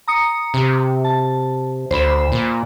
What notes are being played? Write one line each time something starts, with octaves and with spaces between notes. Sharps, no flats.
A#5 D#6 C#7
C3
A5
D2 C5 B5 E7
A#2